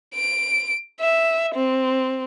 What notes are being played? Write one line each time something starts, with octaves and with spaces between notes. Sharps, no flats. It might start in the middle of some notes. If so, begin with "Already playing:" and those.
D7
E5
C4